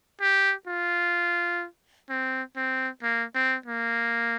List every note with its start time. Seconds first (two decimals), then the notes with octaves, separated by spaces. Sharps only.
0.21 G4
0.67 F4
2.09 C4
2.56 C4
3.03 A#3
3.35 C4
3.66 A#3